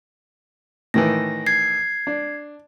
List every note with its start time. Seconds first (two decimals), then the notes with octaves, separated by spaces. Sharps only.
0.94 A2 D#3 E3 A#6
1.46 G#6 C7
2.07 D4